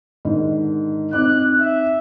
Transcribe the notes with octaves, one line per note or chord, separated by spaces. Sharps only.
G#2 D3 D#3
C4 D#4 D6 F#6
E5